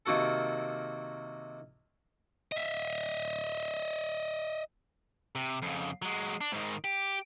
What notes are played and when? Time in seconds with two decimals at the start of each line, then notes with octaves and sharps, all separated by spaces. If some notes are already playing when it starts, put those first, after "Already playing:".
0.06 C3 D#3 A#3 F#4 A4
2.52 D#5 E5
5.35 C3
5.62 F2 C#3
6.02 F#3 G#3
6.41 D4
6.52 G#2 D#3
6.84 G4